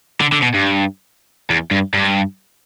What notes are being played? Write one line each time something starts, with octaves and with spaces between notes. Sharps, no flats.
D3
D3
B2
G2
E2
G2
G2